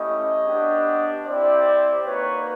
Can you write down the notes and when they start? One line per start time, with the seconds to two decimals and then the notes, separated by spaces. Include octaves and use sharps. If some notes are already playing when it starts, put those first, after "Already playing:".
Already playing: A3 C#4 E4 G4 C#5 D#5
0.45 B3 D4 G4
1.25 C4 E4 G4 C5 D5
2.05 A#3 D#4 F#4 B4 C#5